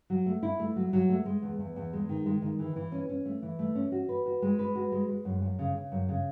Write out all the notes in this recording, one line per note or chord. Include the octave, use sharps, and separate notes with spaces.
F#3
A3
E4
A3
F#3
F#3
A3
G#3
E2
E2
E2
G#3
D#3
G#3
D#3
E3
E3
C#4
C#4
A3
E3
A3
C#4
F#4
B4
F#4
G#3
B4
F#4
G#3
G#3
F#2
F#2
C#3
C#3
F#2
C#3